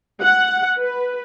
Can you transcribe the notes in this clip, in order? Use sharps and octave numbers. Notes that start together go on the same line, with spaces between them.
F#5
B4